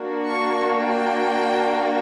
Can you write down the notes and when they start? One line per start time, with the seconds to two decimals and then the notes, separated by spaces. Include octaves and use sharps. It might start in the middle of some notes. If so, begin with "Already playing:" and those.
Already playing: A#3 D4 F#4
0.28 C#6
0.75 G5